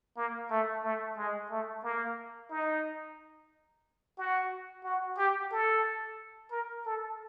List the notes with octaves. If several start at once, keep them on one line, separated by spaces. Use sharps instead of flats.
A#3
A3
A3
G#3
A3
A#3
D#4
F#4
F#4
G4
A4
A#4
A4